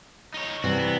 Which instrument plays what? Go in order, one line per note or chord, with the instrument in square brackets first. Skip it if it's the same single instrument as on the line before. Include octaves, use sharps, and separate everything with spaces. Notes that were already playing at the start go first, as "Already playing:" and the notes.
[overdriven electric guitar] D#4 C#5
[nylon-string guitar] C3 E3 G3 [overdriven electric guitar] F#4
[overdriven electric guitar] B3